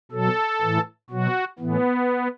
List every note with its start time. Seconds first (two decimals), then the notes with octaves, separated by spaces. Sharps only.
0.12 B2 F#3 A4
0.61 A2 E3
1.10 B2 F#3 F#4
1.59 A2 E3 B3